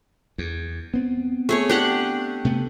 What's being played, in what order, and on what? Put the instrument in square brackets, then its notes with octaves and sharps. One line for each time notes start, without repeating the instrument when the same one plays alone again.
[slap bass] E2
B3 C4
[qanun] A3 G#4 C#5
D4 G4 F#5
[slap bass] C3 A3 B3